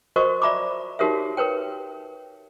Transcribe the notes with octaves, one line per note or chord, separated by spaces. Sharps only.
F#4 A#4 C5 D#5 C#6
D5 E5 A#5 B5 D6
D#4 F#4 G4 A#4 C#5 E5
A#4 B4 C#5 G5